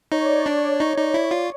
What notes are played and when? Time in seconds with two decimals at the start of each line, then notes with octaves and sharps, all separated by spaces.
0.12 D#4 C#5
0.24 D5
0.36 C#5
0.46 D4 D5
0.62 C#5
0.74 D5
0.80 D#4
0.86 C#5
0.98 D#4
1.14 E4
1.31 F4